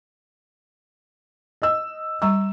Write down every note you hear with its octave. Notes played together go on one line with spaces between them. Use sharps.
D#5 E6
G3 A#5 C#6 E6